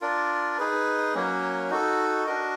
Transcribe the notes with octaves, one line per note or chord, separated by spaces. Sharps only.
D4 F4 A#4 D5
D#4 G#4 B4
F#3 A#3 C#4
D#4 F#4 A4
D4 F#4 A#4 D#5